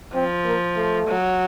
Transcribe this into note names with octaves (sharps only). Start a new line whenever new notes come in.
F3 C4
A#3
A3
F#3